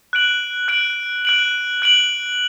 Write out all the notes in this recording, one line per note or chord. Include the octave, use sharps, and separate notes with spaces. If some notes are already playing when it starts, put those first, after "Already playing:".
F#6 D7 F#7
F#6 D7 F#7
F#6 D7 F#7
F#6 D7 F#7